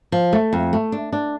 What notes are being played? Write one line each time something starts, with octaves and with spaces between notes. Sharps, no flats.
F3
A3
F2
A3
D4
D4